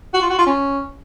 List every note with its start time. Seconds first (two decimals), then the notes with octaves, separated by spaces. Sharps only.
0.14 F#4
0.22 F4
0.30 F#4
0.38 F4
0.46 C#4